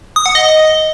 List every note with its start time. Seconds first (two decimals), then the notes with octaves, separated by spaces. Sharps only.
0.16 D#6
0.26 F#5
0.35 D#5